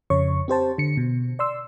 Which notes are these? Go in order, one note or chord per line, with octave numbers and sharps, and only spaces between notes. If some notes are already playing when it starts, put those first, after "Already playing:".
F2 C#3 C#5 C#6
C4 G4 C5 A5
D3 C#7
B2
D5 C6 E6